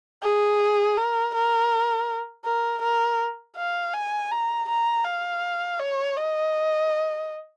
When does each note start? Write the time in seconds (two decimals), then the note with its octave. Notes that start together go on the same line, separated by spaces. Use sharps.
0.23 G#4
0.97 A#4
1.34 A#4
2.45 A#4
2.82 A#4
3.56 F5
3.94 G#5
4.31 A#5
4.68 A#5
5.04 F5
5.79 C#5
6.16 D#5